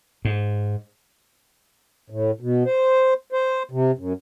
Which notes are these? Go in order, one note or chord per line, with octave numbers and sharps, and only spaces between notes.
G#2
A2
B2
C5
C5
C3
F#2